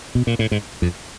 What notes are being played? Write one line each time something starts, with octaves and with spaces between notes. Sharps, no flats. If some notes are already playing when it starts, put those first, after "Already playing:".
B2
A#2
A2
G#2
F2